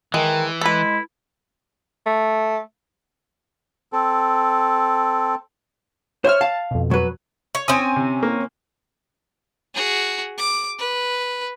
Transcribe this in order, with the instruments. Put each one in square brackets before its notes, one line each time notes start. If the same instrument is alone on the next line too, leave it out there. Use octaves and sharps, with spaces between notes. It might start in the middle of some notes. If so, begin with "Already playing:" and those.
[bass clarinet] D#3 [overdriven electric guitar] E3 [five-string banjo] G#3
[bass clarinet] G#3 [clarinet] E4 [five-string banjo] A4 B4
[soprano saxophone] A3
[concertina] C4 A4
[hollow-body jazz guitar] C5 E5 [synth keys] C#5 F6
[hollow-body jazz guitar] F5 [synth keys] A5
[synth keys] F2 B2
[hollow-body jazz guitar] F#3 B4
[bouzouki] C#5
[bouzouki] C4 C#4 G#5 [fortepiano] D#6
[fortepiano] C3
A#3
[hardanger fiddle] F#4 G#4
D6
B4